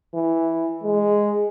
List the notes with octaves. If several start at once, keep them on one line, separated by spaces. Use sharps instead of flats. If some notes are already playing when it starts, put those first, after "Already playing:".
E3
G#3